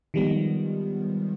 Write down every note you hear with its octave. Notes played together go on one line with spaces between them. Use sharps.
D#3 F3 G3 G#3 B3